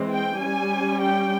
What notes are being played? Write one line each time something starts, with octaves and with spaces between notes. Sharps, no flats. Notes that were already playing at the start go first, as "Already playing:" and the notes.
Already playing: E3 G#3 C4
G5
G3 C#4 G#5
G5